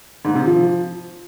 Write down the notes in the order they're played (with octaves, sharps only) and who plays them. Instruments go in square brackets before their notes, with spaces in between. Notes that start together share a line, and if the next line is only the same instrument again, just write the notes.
[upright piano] G#2
C3
F3